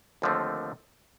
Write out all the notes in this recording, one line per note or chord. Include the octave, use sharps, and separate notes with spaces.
D#2 D3 F3 A3 C4